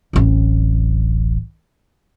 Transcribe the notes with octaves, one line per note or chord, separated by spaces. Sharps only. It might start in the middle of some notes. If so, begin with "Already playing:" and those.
D1 A1